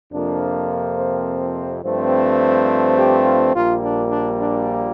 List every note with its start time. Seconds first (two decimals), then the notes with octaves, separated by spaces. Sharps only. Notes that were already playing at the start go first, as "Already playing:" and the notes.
0.11 F2 C3 F3 A#3 D4
0.97 C4
1.83 G2 F3 A3 C4
2.97 G4
3.25 F4
3.54 A#1 A#2 G3 A#3 F4
3.82 D4
4.11 D4
4.40 D4